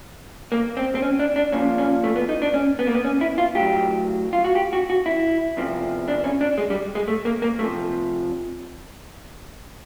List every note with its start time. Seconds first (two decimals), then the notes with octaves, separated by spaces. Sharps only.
0.52 A#3
0.77 C4
0.95 C4
1.02 C#4
1.19 D4
1.36 D4
1.52 A#2 F3 C#4
1.78 C#4
2.04 A3
2.16 B3
2.29 D#4
2.42 D4
2.54 C#4
2.79 B3
2.87 A#3
2.94 B3
3.05 C#4
3.21 E4
3.38 F4
3.55 A2 F#3 G4
4.33 F4
4.44 F#4
4.55 G4
4.73 F#4
4.90 F#4
5.06 E4
5.57 E2 C3 F3
6.08 D4
6.24 C#4
6.41 D4
6.58 G#3
6.70 G3
6.95 G#3
7.08 A3
7.25 A#3
7.42 A#3
7.59 C3 F3 A3